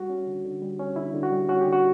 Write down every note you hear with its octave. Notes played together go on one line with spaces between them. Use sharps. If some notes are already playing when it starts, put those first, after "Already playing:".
Already playing: G3 F#4
C#4
D3
D3
G3
C#4
D3 E4
D3
F#4
G3
C#4 F#4
G4
D3
F#4